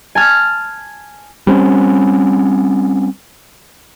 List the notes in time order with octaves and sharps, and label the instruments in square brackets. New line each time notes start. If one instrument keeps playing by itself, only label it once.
[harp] G#5 A5 F6
[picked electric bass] G3 C4 C#4